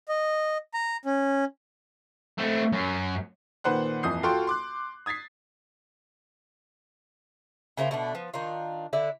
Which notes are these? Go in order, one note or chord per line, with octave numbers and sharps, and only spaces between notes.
D#5
A#5
C#4
A3 C4
F#2
A#2 D#3 B4 C5 F#5 F#6
D#1 F2 E3 D#6 G6 C7
F4 F#4 A4 G5 C6 C#6
C6 D6 F#6
D#6 G#6 A6 B6 C7
C#3 A#3 E4 C5
B2 A3 D4
F3 B3
D#3 D4 F4
D3 E4 D5